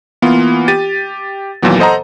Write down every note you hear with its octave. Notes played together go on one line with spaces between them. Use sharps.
E3 A#3 B3 F4
G4 A6 D#7
D#2 A#2 E3 F#3 B3
A4 C5 D#5 F#5 A#5